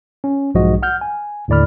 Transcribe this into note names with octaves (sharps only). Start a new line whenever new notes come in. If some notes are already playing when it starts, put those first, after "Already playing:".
C#4
B1 G#2 F3 G#3 F#4 D#5
F#5 F6 G6
G#5
D#2 A2 D3 D5 B5 F6